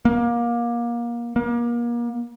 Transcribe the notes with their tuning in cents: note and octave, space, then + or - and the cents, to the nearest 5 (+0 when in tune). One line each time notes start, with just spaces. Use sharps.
A#3 +25
A#3 +35